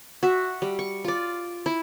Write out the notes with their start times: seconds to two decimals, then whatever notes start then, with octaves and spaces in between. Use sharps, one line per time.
0.23 F#4 E5
0.62 G3
0.79 C#6
1.04 F4 D5
1.66 E4